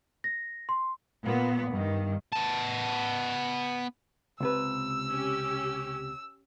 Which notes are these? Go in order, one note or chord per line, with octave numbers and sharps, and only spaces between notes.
A#6
C6
A#2 B3
G2 D#3
B3 A5
C#2 C3 B4 E6
C#4 G4